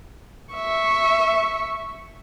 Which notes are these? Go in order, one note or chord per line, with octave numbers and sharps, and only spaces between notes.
E5 C#6